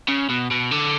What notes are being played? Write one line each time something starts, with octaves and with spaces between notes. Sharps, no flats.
C#3
B2
B2
D3